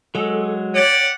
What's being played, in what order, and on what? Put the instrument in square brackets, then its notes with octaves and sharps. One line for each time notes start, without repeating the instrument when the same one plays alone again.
[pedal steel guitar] F#3 G#3 [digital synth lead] A4
[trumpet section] G4 D5 F#5 [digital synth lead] C#5